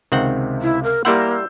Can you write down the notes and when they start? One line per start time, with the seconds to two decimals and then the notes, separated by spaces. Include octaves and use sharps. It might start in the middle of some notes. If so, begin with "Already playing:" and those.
0.12 C#2 C3 D#3 C4 F#5
0.62 E4
0.83 A#4
1.05 G3 A#3 E4 F#5 C6 E6 G6